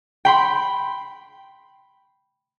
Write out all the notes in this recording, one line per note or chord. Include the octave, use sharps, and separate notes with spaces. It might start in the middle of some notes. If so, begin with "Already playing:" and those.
G5 B5 C6